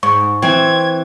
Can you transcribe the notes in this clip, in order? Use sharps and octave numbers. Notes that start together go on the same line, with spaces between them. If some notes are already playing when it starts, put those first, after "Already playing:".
G#2 C#6
E3 C4 G#6